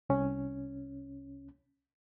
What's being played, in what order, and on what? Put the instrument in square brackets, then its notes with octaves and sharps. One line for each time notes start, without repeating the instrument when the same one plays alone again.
[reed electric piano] C2 C#4